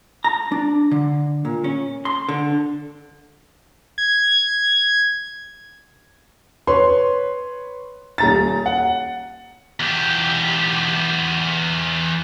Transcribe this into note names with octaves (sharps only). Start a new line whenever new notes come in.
A#5
D4
D3
A#2
C#4
C6
D3
G#6
B4 C#5 C6
D#1 A#5 A6
F#5
E2 G4